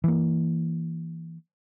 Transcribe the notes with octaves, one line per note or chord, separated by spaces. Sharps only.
E3 A#3